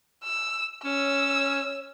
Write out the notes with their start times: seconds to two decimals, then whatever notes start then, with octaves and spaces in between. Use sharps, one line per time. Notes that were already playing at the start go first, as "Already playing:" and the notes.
0.24 E6
0.84 C#4 C#5 E6